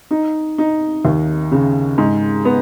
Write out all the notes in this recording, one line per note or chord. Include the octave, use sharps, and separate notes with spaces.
D#4
D#4
D#2
C#3
G#2
B3